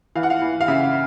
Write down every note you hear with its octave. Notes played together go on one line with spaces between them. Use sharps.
E3 F5
F#5
F5
E3
F5
C#3 E5